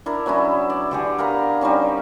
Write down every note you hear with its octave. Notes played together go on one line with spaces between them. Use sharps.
D4 E4 A#4 D5
F#3 B3 C#4 E4
D5
D3 G4 G#4
A#4 F5 A#5 B5
G3 C4 C#4 D#4